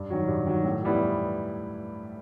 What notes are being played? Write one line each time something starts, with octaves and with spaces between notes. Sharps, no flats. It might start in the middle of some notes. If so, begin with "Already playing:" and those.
Already playing: G2
D#3 F#3
G2
D#3 F#3
A2
E3 G3 B3 E4